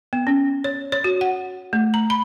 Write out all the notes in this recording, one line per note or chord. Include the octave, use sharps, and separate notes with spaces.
B3
C#4
C#5
C#5
F#4
F#5
A3
A#5
B5